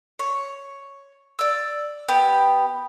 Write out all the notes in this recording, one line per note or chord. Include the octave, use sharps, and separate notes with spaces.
C#5
D5 E6
B3 G4